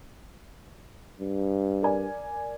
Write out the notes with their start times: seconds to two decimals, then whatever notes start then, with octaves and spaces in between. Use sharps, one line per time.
1.20 G2
1.82 A#4 D5 G#5